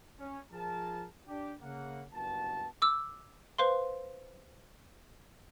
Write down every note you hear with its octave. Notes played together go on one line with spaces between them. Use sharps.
C#4
F3 G#4 A#4 A5
D4 G4
C#3 A#3 F#5
F#1 G2 B3 F#4 A5
D6 E6
B4 C5 F5 C6